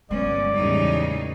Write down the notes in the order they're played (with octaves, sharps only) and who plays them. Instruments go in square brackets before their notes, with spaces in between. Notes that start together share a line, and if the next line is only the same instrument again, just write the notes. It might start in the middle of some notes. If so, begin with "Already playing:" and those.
[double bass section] G1 C3 B3 [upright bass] F#3 G#3 [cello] C#4 [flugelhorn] D5
[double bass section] E2 A2 G3 [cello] C#3 D#4